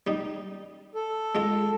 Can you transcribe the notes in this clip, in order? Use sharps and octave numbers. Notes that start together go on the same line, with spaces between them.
G3 D#4
A4
G#3 F4